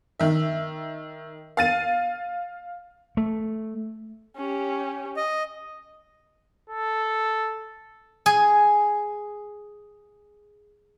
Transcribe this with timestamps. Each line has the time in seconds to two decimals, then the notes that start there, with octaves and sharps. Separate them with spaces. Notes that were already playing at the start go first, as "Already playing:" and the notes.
0.20 D#3 E5
1.57 F5 A6 D#7
3.17 A3
4.36 C#4 G4
5.16 D#5
6.70 A4
8.26 G#4 G#5